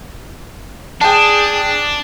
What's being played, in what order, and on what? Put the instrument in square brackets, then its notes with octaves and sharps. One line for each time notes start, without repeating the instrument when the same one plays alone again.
[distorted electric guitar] D4 [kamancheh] G#4 [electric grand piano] G5 A5